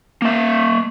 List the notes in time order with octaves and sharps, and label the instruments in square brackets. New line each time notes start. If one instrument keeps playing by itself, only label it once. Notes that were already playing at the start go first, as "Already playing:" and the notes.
[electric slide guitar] A#3 E5